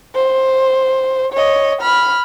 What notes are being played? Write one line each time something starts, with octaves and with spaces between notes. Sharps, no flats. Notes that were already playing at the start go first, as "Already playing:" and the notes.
C5
C#5 D#5
B5 F6